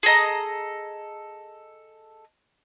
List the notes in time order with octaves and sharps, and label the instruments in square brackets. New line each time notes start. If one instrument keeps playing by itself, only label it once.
[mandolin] G#4 A4 D#5 A#5